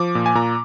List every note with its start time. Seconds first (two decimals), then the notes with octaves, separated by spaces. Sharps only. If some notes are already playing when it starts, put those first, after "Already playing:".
Already playing: F3 D6
0.15 A#2
0.26 G#5
0.35 A#2 A#5